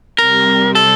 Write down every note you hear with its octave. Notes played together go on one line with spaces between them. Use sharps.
C3 G3 C4 A#4
A4